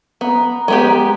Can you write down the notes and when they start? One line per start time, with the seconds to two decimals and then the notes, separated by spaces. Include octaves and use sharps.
0.21 B3 A#5
0.68 G#3 B3 G4